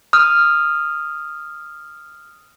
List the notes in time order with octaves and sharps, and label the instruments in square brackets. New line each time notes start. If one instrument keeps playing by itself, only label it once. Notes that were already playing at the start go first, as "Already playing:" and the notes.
[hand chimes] D#6 F6